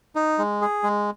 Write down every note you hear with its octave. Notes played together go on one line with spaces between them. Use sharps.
D#4
G#3
G#4
G#3